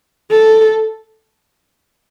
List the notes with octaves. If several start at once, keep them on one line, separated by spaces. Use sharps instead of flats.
A4